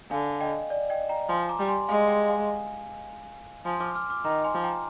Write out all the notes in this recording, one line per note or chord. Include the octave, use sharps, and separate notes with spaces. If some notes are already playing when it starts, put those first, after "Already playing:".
D3 F5 G#5
D#5 G5
D5
D#5 G5
G5 A#5
F3 G#5 C6
A#5 D6
G3
G#5 C6
G#3 F5 G#5
D#5 G5
F5 G#5
F3 G#5 C6
D6 F6
D6 F6
D6 F6
D#3 A#5 D6
G#5 C6
F3
G5 A#5